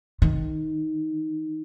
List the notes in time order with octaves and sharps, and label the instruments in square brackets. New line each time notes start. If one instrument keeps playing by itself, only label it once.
[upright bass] D#3